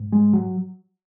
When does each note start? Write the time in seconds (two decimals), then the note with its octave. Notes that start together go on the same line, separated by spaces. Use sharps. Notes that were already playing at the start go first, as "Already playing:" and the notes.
Already playing: G#2
0.12 G#3
0.33 F#3